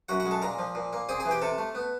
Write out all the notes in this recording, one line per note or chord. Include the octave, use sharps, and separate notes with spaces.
F#2 F#4 F#5
F#4 F#5
G#3
A4 A5
A#2 A#4 A#5
F3
A#2
A#3
C4 G#4 G#5
G#4 G#5
E3
G4 G5
C3 A4 A5
A3
B3